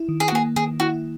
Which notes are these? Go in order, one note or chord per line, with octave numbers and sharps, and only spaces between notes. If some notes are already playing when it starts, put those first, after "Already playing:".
Already playing: E4
D#3
G#4
F#4
A#3 G#4
D#3 G#4
E4 F#4